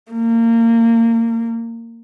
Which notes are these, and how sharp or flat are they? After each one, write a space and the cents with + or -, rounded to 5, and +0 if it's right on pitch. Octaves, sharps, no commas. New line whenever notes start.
A#3 -25